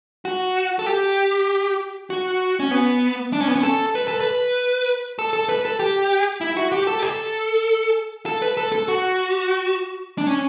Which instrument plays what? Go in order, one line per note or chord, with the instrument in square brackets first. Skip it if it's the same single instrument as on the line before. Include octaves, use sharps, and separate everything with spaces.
[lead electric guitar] F#4
A4
G4
F#4
C#4
B3
D4
C#4
B3
C#4
A4
B4
A4
B4
A4
A4
B4
A4
G4
E4
F#4
G4
A4
G4
A4
A4
B4
A4
A4
F#4
D4
C#4